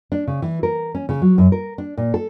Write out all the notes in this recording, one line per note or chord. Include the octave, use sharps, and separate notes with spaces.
D4
C#3
E3
A#4
C#4
C#3
F#3
F#2
A#4
D4
A#2
A4